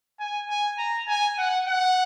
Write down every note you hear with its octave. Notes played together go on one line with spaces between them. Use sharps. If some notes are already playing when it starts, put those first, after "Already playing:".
G#5
G#5
A#5
G#5
F#5
F#5